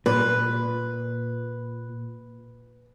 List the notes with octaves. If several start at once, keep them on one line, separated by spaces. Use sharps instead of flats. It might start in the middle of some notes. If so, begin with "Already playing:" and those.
A#2 B4